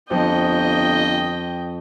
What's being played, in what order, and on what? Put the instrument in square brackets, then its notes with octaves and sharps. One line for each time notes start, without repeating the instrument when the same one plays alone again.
[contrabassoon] G1 [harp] F2 [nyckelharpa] D#5 G5